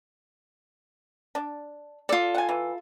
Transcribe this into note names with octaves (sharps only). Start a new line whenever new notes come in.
D4
F4 A4 D5
F#5 G#5
E3